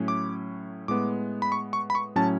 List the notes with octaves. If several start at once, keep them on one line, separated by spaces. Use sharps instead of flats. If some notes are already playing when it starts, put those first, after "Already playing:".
Already playing: A2 F#3 A3 C#4
D6
A2 G#3 B3 D6
B5
C#6
C#6
B5
C#6
A2 F#3 C#4 A5